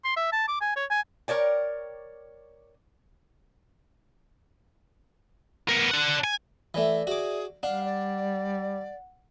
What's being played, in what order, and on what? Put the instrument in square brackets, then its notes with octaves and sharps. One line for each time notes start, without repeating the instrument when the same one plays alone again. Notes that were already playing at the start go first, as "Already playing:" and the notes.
[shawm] C6
E5
A5
D6
G#5
C#5
G#5
[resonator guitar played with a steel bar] A#4 C#5 D5 G5
[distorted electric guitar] B3 A#4
D4 F#5
G#5
[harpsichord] E3 A3 [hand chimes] D5 E5
[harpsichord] F#4 D6 [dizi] G#4
[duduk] G3 [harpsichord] D4 [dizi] F5 [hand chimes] F#5
[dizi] D5